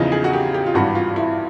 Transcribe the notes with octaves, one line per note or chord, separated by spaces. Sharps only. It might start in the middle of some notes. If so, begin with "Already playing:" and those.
Already playing: E2 C#3 F3 D#4
G#4
F#4
G4
G4
F4
G#1 G2 E3 G3 F#4
F4
E4